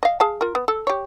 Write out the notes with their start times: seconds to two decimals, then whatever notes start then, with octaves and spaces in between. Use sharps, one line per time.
0.03 D#5 F5
0.20 G#4 F5 A5
0.41 F4 A#4
0.55 B3
0.68 A4
0.87 G4 C#5